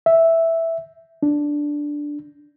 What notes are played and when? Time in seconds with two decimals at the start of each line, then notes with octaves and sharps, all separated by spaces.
0.06 E5
1.23 D4